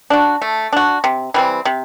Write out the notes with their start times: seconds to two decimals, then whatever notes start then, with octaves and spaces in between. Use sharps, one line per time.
0.10 D4 F#4
0.42 A3
0.73 D4 F#4
1.04 C3
1.34 E3 G3 C4
1.65 C3